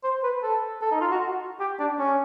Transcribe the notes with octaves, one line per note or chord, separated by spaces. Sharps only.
C5
B4
A4
A4
D#4
F4
F#4
G4
D4
C#4